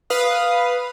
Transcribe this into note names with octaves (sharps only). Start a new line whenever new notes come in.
B4 F5 D#6